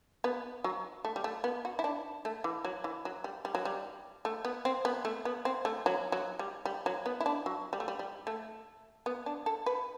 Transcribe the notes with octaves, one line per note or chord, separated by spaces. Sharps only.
B3
F#3
A3
G3
A3
B3
F#4
E4
D4
A3
E3
F#3
E3
F#3
G3
G3
F#3
G3
A3
B3
C4
B3
A3
B3
C4
A3
F#3
F#3
G3
G3
F#3
B3
E4
D4
F#3
G3
A3
G3
G3
A3
B3
D4
A4
B4